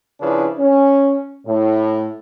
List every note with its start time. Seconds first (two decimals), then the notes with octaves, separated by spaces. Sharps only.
0.21 C#3 F3 C#4 D4 E4 B4
0.58 C#4
1.47 A2